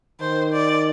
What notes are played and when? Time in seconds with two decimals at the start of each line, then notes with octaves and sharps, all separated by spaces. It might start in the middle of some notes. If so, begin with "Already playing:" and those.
0.20 D#3 C5
0.53 D5